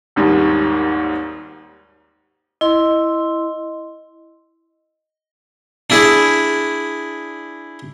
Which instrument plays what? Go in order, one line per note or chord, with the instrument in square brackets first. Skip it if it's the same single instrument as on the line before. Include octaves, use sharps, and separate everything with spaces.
[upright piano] G#1 D#2 G#2 G3
[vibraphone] E4 C6 [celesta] D#5
[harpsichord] D4 E4 G#4